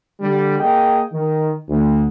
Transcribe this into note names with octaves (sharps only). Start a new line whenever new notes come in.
D3 G3
A#3 G#4 D#5 G5
D#3
D2